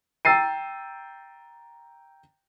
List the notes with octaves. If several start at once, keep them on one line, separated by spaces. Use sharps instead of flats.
G5 A#5 E6 A6 C7 D#7